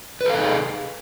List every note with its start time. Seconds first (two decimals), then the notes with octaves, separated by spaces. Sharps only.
0.21 B4
0.25 A4
0.30 F5
0.34 D#4
0.39 G#4